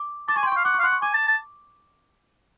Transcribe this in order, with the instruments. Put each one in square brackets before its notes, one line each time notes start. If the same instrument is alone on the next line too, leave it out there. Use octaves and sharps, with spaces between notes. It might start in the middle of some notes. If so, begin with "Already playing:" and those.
Already playing: [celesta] D6
[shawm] A5 [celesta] D6
[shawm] G#5 [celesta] C#6
[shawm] G5 [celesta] C6
[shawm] F5 [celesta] C#6
[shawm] F#5 [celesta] D6
[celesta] C#6
[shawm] F5
[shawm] F#5 [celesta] C6
[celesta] C#6
[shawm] G#5 [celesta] D6
[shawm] A5
A5